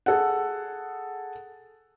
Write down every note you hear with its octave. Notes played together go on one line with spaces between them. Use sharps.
G#4 A4 F#5